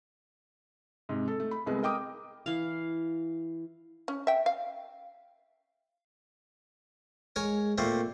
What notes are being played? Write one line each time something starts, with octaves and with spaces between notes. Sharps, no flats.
G#2 C3
A4
A3
B5
C2 G#3 B3
A#4 D#5 G5 D6 D#6
E3 F5
C#4
E5 G5
F5
G#3 A#4 C#5 G#5
A#2 A3 A#3 C4